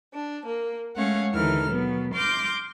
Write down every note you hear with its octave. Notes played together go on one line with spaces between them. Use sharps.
D4
A#3
G#3 A3 C#4 C#5 F5 F#5
D#2 D3 E3 D#4 A4 F6
B2 F#3 B3
C6 D6 F6 G6 A#6